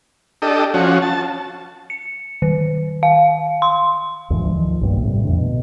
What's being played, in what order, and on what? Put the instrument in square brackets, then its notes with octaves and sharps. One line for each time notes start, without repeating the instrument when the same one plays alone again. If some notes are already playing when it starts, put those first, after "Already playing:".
[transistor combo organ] D4 G4 A4 D#5
F3 C#4 F#4
A5
[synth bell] C#7
D#3
F5
C6
[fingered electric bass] D2 G#2 E3 F3
D#3 F3
B1 G2 A#2
A2 C3 F#3 G3
F2 A2 D3
B2